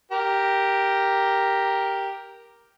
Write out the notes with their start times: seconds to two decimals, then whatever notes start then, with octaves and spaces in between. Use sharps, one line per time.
0.12 G4 A#4